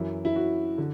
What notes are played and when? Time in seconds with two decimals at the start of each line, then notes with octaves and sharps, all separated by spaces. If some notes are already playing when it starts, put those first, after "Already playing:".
Already playing: F#2 E3 E4
0.25 E4
0.36 F#4
0.78 D3